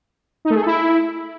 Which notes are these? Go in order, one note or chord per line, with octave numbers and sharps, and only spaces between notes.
D#4
A3
G#4
A4
E4